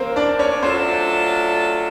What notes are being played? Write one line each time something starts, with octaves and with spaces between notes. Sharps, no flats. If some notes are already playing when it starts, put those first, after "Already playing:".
Already playing: C3 E3 A3 A#3 C4 C#4 A#4 C5
D4 D5
C#4 C#5
F#3 A3 C4 D4 F4 A4 C5